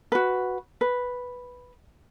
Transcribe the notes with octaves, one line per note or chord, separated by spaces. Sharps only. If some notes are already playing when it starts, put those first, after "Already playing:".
F#4 B4
B4